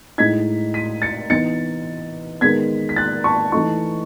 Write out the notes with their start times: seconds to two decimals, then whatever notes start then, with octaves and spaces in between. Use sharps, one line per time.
0.18 A2 G#3 D#4 G#6 B6
0.74 B6 D#7
1.02 A6 C#7
1.30 E3 B3 D#4 A6 C#7
2.41 D#3 G#3 B3 G#6 B6
2.89 B6
2.96 F#6 A6
3.24 A5 C#6
3.52 E3 A3 D#4 A5 C#6